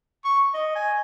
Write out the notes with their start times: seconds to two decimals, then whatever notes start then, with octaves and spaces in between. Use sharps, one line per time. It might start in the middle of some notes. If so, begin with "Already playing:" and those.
0.25 C#6
0.54 D#5
0.75 G#5